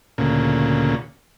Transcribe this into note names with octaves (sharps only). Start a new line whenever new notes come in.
D2 A#2 C#3